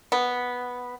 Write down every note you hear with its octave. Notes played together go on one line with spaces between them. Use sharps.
B3